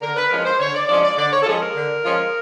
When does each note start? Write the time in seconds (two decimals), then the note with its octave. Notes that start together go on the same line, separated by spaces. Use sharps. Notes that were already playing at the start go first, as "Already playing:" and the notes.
0.02 D3 A#4
0.16 B4
0.30 F3 G#3 C#4 F4 A#4
0.45 C5
0.60 D3 C#5
0.74 D5
0.89 F3 G#3 C#4 F4 D5
1.03 D5
1.18 D3 D5
1.32 C#5
1.42 A4
1.46 F3 G#3 C#4 F4 G#4
1.61 A#4
1.76 D3
2.05 F3 G#3 C#4 F4